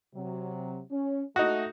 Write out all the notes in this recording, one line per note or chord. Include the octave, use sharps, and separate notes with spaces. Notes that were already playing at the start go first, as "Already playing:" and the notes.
C3 F#3
C#4
A3 D#4 F#4